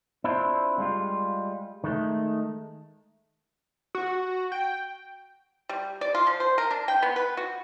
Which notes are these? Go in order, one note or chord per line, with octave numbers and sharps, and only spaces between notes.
C4 D4 E4 F4
G3 G#3 F4
D#3 G#3 A3
F#4
G5
G3
D5
F4
F3
C5
A#4
D4
G5
B3
B4
F#4